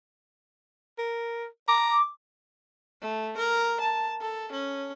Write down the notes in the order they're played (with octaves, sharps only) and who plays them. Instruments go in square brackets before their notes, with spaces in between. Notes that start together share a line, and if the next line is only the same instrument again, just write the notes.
[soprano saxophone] A#4
[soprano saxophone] A#5 [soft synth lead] D6
[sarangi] A3
A#4
A5
A4
C#4